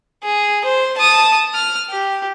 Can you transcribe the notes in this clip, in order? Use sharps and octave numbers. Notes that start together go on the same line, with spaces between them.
G#4
C5
A5 D#6
F6
G4